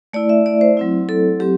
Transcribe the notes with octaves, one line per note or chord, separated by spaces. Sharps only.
A3 E4 D5
E5
D5
C5
F#3 C4 E4
A4
F#3 C4 G4